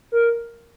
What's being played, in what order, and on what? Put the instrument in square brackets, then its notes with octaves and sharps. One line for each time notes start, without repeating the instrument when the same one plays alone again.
[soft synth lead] A#4